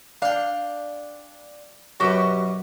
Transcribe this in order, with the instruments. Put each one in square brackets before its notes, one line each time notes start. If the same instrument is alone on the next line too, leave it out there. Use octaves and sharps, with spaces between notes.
[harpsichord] D4 G5 [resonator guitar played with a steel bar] F5
[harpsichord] F#2 B2 [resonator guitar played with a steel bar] F#4 G4